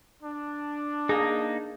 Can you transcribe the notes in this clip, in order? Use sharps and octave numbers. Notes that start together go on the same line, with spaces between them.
D4
A#3 D#4 G#4